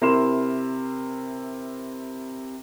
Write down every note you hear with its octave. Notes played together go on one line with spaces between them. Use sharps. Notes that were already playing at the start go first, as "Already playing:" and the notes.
C3 E4 A#4 C6 E7